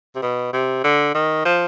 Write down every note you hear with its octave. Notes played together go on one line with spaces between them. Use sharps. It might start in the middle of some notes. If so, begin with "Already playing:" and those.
C3
B2
C3
D3
D#3
F3